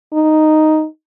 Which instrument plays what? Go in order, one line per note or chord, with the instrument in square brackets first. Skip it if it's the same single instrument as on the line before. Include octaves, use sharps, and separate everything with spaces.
[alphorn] D#4